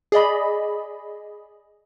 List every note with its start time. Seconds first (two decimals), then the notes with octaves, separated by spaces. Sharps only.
0.12 G#4 D5 D#5 B5